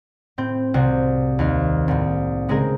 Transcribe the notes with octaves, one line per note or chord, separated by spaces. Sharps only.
A2 C4 G6
C2 C3 F#4 C5
D#2 D#4 F5
C2 A2
C#3 G#3 C4 G#4 A#4 C5